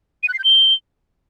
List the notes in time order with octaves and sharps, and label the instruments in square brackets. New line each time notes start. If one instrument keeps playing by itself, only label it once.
[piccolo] D#7
F#6
C7
G6
G7